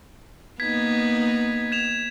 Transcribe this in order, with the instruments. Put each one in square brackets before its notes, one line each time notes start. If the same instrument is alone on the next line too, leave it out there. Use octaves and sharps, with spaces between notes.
[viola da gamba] A#3 B3 D#4 [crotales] G#6 B6
[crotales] G#6 E7 F7